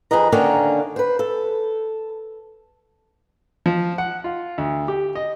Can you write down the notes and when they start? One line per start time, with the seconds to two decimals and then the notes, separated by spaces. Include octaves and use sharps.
0.11 F2 C#3 G#4 B4 D#5 A#5
0.32 D3 D#3 A#3 C#4 D4
0.96 B4 C5
1.19 A4
3.66 F3
3.98 F#5
4.24 F4
4.58 D2
4.88 G4
5.15 D#5